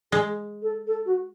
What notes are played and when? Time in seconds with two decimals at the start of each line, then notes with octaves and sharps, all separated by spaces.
0.11 G#3 G#4
0.62 A4
0.86 A4
1.05 F#4